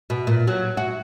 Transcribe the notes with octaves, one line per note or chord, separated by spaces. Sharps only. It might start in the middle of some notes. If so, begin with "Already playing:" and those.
B2
A#2
F#3
F#4